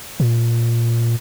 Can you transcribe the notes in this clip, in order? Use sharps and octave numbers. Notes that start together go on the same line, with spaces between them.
A#2